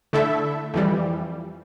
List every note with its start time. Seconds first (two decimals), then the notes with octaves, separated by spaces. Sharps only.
0.13 D3 A3 E4 A4 E5
0.74 F2 E3 G3